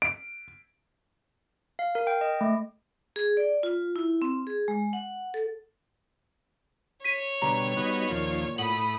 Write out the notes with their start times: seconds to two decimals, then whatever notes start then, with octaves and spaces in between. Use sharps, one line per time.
0.02 D7
1.79 F5
1.95 A#4
2.07 G5
2.21 D#5
2.41 A3
3.16 G#4
3.37 D5
3.63 F4
3.96 E4
4.22 C4
4.47 G#4
4.68 G#3
4.93 F#5
5.34 A4
7.04 C#5 B6 D#7
7.42 B2 D3 G3 A#5
7.77 B3 D#4 F#4
8.10 D#2 A#2 F3
8.58 A2 F#5 B5 D#6 F#7